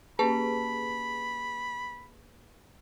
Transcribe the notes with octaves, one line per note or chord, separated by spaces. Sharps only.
A#3 C#4 G4 G#4 B4 A5 B5